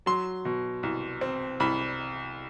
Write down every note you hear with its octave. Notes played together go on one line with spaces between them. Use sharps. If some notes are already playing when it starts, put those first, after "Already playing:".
F#3 C6
B2
C2
C4
C2 B5